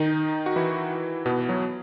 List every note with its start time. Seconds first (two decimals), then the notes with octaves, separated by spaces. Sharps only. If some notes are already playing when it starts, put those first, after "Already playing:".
Already playing: D#3 D#4
0.46 F#4
0.56 E3 E4
1.26 B2 B3
1.49 F#3